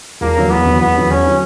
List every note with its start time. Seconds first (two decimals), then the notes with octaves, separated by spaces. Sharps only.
0.21 E1 A#3
0.37 E2 D3 F#3
0.51 E1 B3
0.65 E2 D3 F#3
0.81 E1 B3
0.95 E2 D3 F#3
1.10 E1 C#4
1.26 D3 F#3